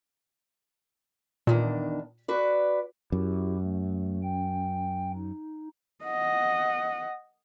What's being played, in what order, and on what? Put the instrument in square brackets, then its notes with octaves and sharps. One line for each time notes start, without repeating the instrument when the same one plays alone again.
[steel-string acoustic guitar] E2 D#3 D4 [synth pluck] A#2
[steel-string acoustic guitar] F#4 B4 D5
[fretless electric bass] F#2 [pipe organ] E4 G4
[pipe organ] A3
C#4 G5
D#4
[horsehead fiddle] D#5 F#5